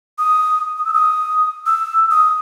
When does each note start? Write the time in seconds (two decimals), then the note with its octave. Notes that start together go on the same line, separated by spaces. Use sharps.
0.18 D#6
0.77 D#6
0.85 E6
0.94 D#6
1.66 E6
2.11 D#6